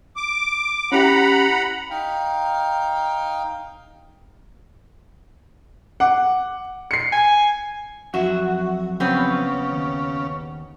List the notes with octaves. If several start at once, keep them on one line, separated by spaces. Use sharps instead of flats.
D6
C#4 E4 G4 F#5 A#5 B5
D#4 F5 G5
F#5 D6
C7 C#7
G#5
F2 F#3 F#4 E5
C#3 B3 C4
D#2